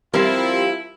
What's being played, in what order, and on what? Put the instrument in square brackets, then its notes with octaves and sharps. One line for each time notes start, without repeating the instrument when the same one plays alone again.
[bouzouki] F3 F4 [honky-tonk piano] G3 [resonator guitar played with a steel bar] C4 A#4 [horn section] E4